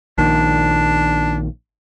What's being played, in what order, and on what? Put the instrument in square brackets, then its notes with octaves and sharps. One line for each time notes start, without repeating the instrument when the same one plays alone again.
[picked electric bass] A#1 A#2 D#3 [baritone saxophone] D4